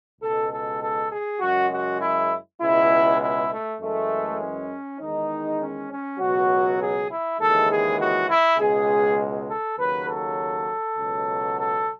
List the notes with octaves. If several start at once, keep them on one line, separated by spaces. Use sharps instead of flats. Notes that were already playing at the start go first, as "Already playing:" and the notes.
C#2 B2 G#3 A4
A4
A4
G#4
F#2 C#3 G#3 F#4
F#4
E4
C#2 B2 G#3 E4
E4
A3
F#2 E3 G#3 A3
C#4
E2 D#3 G#3 D#4
C#4
C#4
C#2 B2 F#3 F#4
G#4
E4
D#2 C#3 E3 G#3 A4
G#4
F#4
E4
C#2 B2 G#3 G#4
A4
D#2 C#3 F#3 B4
A4
C#2 B2 F#3
A4